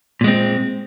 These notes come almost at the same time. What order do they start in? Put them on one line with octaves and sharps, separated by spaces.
A#2 G#3 C4